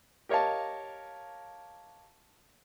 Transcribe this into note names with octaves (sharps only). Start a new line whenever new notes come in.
G4 A#4 C#5 D#5 F5 A5